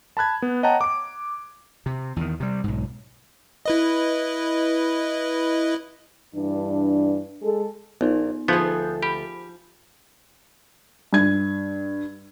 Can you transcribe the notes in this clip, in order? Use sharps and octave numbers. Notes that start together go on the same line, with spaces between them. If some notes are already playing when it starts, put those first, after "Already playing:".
A5 B5 F#6 G#6
B3
C#5 D#5 F#5 G5 A5 A#5
D6 D7
C3
E2 D#3
C3 G3
B1 G#2
E4 B4 D#5
G2 E3 D4
G#3 G#4 A4
A#1 B3 D#4
D2 F3 B3 G#4 A4 E5 G6
G4 B5
G2 G#6